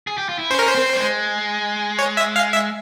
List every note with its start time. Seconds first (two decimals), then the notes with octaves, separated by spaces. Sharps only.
0.07 G#4
0.18 G4
0.29 F4
0.39 E4
0.50 C#4 C5
0.59 A#4
0.67 C5
0.75 C4
0.95 G3
0.99 G#3
1.99 C#5
2.17 E5
2.36 F5
2.53 E5